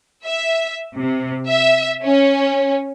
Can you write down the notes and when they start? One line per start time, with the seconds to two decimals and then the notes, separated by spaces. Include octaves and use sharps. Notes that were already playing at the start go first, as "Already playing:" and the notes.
0.25 E5
0.95 C3
1.48 E5
2.04 C#4